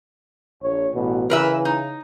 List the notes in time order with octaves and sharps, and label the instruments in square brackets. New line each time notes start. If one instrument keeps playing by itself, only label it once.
[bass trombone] A#1 [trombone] C#5
[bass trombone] A1 [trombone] B2
[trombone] C#3 [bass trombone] E3 [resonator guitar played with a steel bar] A#4 B4 E5
[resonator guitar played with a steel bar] D#4